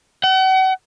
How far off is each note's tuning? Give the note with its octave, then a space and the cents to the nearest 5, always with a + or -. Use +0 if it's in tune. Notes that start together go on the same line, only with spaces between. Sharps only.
F#5 +40